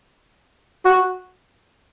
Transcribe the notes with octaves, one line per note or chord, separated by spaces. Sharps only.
F#4